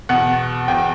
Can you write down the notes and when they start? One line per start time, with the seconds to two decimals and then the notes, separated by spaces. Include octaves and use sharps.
0.09 E2 B2 F#5
0.68 E2 B2 G5